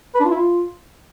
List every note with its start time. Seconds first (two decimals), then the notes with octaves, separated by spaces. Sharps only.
0.15 B4
0.20 D4
0.25 F4
0.30 E4
0.35 F4